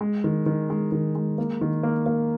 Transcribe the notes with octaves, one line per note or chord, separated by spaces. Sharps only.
G#3
D#3
D#3
G#3
D#3
G#3
A#3
D#3
A#3
A#3